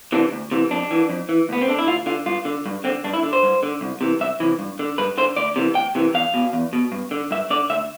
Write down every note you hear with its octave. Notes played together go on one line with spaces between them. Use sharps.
C3 E3 D4
D2
C3 E3
F2 D4
E3
F2
E3
D2 B3
C4
D3 D4
E4
D2 F4
D3 F4
G2 F4
D3
G2
D3 C4
G2 D4
E4
D3
C5
G2
D3
C2
C3 E3
C2 E5
C3 E3
G2
D3
G2 B4
D3 C5
D2 D5
C3 E3
D2 G5
C3 E3
E2 F5
B2
E2
B2
G2
D3
G2 E5
D3 D5
D2 E5